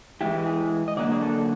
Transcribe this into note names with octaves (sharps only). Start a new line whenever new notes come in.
E3 G#3 C#4 E4 G4
G#4
D#5
D3 F#3 A#3 D4 D5
G#4
A4